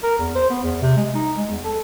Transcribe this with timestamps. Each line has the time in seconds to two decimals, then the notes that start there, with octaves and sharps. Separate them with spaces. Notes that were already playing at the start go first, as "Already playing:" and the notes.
0.03 A#4
0.19 E2
0.35 C5
0.50 B3
0.63 E2
0.81 C3
0.97 G#3
1.15 D#4
1.36 G#3
1.51 E2
1.64 A4